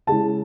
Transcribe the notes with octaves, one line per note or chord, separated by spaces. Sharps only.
C#3 G#3 C#4 E4 A5